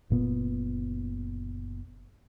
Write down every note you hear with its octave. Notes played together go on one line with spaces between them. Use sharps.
F#1 A#2 B3